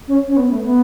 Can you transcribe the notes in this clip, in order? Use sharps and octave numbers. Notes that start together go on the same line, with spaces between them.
C#4
C#4
B3
A3
B3